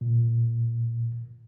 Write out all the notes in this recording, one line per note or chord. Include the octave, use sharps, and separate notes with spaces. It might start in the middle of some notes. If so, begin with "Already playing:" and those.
A#2